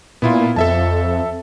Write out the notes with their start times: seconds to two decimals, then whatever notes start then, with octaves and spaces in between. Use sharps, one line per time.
0.22 A#2 B3 E4 F4
0.56 F2 A4 E5 A5